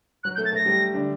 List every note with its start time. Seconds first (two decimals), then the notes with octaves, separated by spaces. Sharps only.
0.24 F#3 F#4 F#6
0.35 A3 A4 G6
0.45 A6
0.52 A3 A4 A#6
0.66 G3 G4
0.94 D3 D4